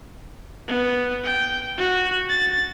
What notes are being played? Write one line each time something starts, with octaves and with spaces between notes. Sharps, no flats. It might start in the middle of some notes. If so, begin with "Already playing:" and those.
B3
G5
F#4
A6